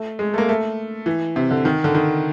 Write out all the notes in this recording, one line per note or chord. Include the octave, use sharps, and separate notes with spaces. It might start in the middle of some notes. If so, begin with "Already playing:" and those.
Already playing: A3
G#3
A3
A#3
A3
E3
C3
D3
D#3
D3
D#3